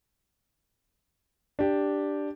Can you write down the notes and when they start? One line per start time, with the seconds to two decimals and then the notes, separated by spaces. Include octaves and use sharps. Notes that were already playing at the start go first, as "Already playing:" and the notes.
1.59 D4 G4